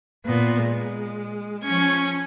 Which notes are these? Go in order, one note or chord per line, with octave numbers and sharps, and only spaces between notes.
A#2 B3
G#3
F3 C#4 C#6 G#6